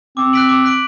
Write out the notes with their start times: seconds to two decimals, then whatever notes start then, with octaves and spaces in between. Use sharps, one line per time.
0.17 C4 D6
0.33 F#6 B6 D7 F#7
0.49 D6
0.65 F#6 B6 D7 F#7